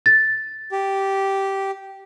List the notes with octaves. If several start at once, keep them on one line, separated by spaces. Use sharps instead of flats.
A6
G4